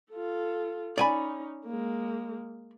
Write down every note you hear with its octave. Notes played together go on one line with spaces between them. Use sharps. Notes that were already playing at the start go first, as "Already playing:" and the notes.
F4 A4
C#4 D#4 D5 G#5 B5
G#3 A#3